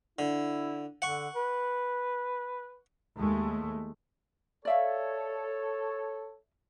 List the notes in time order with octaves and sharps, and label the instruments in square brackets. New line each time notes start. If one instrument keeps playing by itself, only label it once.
[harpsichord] D3 [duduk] E4
[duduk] D3 [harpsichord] F#5 C#6
[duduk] B4
[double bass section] D#2 G#3 A3
[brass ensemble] A4 C#5 [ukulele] D5 E5 F5